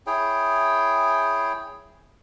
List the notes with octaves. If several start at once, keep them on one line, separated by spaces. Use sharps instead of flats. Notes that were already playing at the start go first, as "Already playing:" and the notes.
E4 G#4 C#5 G5